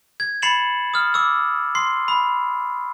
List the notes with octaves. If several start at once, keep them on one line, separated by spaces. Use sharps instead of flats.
G#6
B5 A6 C7 C#7 E7 F#7
D#6 F6
D6 E6
C6 C7
B5